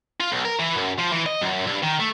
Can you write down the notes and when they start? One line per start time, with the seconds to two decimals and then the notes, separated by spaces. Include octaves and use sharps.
0.20 F4
0.32 B1
0.45 A#4
0.59 E3
0.76 F#2
0.99 F3
1.13 E3
1.26 D#5
1.41 F#2
1.67 G2
1.82 D#3
1.99 A3